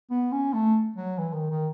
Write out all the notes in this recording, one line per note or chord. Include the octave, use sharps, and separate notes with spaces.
B3
C#4
A3
F#3
E3
D#3
D#3